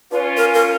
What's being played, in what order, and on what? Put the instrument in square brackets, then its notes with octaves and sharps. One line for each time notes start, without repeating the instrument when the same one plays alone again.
[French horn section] C#4 F4 [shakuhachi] B4
[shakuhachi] A#4
A#4